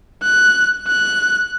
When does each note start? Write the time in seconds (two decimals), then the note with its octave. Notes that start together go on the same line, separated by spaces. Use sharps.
0.23 F#6
0.88 F#6